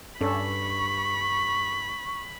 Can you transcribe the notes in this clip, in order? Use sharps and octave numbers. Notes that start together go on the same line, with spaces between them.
G2 C#4 D4 A4 B5 C#6